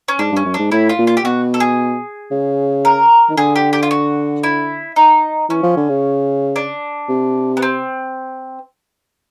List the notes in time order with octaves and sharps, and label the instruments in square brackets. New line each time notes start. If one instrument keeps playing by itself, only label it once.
[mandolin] C#4
[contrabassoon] G#2 [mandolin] D4
[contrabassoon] G2
[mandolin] C#4
[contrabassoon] F#2
[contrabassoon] G#2 [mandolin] D4
[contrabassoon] A2 [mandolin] E4
[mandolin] F4
[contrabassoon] A#2
[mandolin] F4
G4
[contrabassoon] B2 [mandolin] F#4
[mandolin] A4
G#4
[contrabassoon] C#3
[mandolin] A#4
[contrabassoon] D#3
[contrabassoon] D3 [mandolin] G#4
[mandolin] G4
G4
F4
F#4
E4
D#4
[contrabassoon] E3 [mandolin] C#4
[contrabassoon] F3
D3
C#3
[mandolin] D4
[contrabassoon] C3
[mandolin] B3
C4